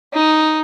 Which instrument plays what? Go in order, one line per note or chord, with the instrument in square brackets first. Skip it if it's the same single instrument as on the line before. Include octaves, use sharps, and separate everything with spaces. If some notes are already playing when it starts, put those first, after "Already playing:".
[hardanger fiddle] D#4